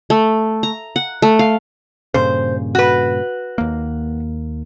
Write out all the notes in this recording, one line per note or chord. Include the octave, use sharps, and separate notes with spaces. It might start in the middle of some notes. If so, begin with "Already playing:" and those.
A3
A#5
F#5
A3
F5
G2 A#2 C#3 C5
F#4 B4
D#2 A#3